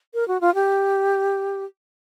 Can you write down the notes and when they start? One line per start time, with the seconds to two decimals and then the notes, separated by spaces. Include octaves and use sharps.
0.14 A#4
0.28 F#4
0.41 F4
0.55 G4